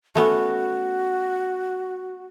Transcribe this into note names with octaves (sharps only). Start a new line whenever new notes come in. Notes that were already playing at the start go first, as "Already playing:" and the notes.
A3 B3 C#4 F#4